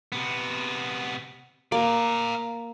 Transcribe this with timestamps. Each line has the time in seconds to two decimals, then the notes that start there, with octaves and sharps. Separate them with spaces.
0.12 C3 B3
1.72 A#3 D5 F5